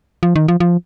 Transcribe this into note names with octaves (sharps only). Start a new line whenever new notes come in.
F3
D#3
F3
F3